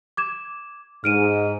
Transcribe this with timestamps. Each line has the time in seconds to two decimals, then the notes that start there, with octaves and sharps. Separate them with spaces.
0.17 D6 G#6 E7
1.04 G#2 F6 D7 D#7